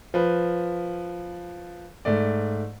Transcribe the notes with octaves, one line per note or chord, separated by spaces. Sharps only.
F3 B4
G#2 A3 D5